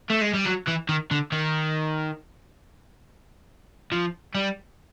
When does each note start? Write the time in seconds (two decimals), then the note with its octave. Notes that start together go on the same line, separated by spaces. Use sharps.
0.10 A3
0.22 G#3
0.34 G3
0.47 F#3
0.68 E3
0.89 D#3
1.11 D3
1.32 D#3
3.92 F3
4.35 G3